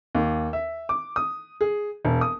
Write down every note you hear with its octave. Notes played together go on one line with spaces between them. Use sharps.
D#2
E5
D6
D#6
G#4
E1
D#6